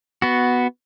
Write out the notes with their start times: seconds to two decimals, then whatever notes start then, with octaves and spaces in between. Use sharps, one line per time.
0.22 B3 F#4